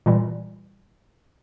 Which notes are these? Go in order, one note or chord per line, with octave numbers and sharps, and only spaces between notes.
A#2 E3 G3